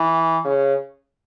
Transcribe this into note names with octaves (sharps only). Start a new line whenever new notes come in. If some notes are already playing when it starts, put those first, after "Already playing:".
Already playing: E3
C#3